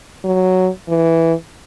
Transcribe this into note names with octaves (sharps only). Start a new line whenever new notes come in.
F#3
E3